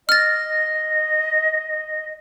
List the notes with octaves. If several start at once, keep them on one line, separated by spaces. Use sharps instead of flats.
D#5 F6 A6